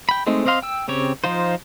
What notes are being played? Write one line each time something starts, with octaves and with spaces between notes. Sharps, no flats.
G5 B5
G#3 A3 C4 D#4
C4 C5 D#5 F5 C6
G5 E6
C#3 C4 G4 C#5
F3 D#4 F4 C5